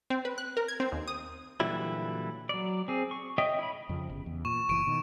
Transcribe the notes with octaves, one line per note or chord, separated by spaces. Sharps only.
C4
B4
F#6
A#4
G#6
C4
D#2
D#6
A#2 D3 E3 F#3 G3 E4
F#3 D5
C4 G#4
C#6
C#5 D#5 E5 G5 D#6
E4 B5
F2 C#3 F3
G1 C#3
E2
A#2 C#6 E7
F#1 E3 C#6 D7 D#7
B2 D#3